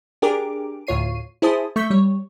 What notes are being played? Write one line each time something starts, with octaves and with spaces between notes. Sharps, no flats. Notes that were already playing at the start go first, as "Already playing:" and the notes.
D4 G4 G#4 A#4 D6
D2 A2 F4 C#5 C7 D#7
E4 G#4 C5 A5 D#6
A3 C#6 G6 B6
G3 C#5